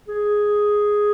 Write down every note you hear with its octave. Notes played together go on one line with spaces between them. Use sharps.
G#4